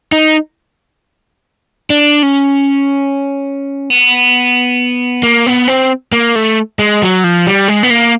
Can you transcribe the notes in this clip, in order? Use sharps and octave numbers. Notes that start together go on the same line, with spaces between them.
D#4
D4
C#4
B3
A#3
B3
C4
A#3
A3
G#3
F#3
F3
G3
G#3
B3
A#3